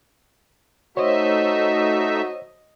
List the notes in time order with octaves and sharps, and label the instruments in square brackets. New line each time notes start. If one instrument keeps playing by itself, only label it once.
[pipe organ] A3 D#4 E5 [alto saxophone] F#4 [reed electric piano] C5 C#5 [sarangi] D#5